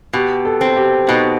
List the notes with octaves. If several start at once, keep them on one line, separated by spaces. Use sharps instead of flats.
B2 G4
A4
C4
G4
B2 D#4